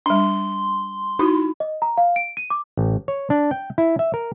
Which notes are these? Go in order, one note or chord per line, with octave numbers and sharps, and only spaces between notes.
G3 D4 C6
D#4 E4 F#4
D#5
A#5
F5
D7
D#7
D6
A1
C#5
D4
G5
E4
E5
A#4